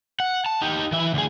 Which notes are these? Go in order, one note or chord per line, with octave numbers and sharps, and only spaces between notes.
F#5
A5
D#4 G4
E3 E5
D2 G#4